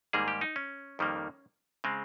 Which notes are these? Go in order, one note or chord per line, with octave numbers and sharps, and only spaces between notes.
G#2 D#3 G3 A#3 G#4
G4
D#4
C#4
F2 D#3 G3 A#3
C#3 G#3 C4